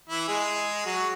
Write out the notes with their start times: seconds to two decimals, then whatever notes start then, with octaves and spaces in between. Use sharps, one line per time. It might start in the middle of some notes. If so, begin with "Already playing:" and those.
0.09 E3 E4
0.28 G#3 G#4
0.86 F#3 F#4